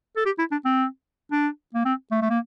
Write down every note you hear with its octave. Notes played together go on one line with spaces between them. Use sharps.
A4
G4
E4
D4
C4
D4
A#3
C4
A3
A3
A#3